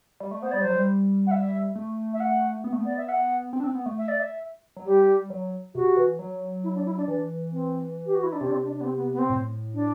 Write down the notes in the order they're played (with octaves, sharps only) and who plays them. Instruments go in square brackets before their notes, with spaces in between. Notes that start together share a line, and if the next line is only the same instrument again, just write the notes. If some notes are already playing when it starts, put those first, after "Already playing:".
[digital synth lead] G3
A3
[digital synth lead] B3 [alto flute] C5
[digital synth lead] G3 [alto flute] D5
[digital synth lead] F#3 [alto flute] C5
[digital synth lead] G3
[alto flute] F#5
E5
[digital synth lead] A3
[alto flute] E5
F#5
[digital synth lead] B3
A3
B3
[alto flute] D5
E5
F#5
[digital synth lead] C4
D4
C4
B3
A3
[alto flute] E5
D5
E5
[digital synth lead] F#3
[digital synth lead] G3 [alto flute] G4
[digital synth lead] F#3
[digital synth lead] C3 [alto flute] F#4
[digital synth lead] E3
F#3
[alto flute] E4
D4
E4
D4
[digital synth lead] E3 [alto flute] D4
[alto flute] C4
G4
F#4
E4
D4
[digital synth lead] C3 [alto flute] C4
[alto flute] D4
C4
D4
D4
B3
C4
B3
B3
C4
[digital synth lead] A2
[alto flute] D4